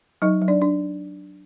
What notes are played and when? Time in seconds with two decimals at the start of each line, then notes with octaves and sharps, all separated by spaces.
0.22 F#3 D#4 D#5
0.42 F#3
0.48 D4 D5
0.61 D4